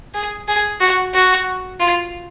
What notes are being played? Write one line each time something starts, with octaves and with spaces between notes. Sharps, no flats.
G#4
G#4
F#4
F#4
F4